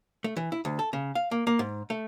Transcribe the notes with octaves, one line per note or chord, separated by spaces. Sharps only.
A3
E3
E4
D2
A4
C#3
F5
A#3
A#3
G#2
A3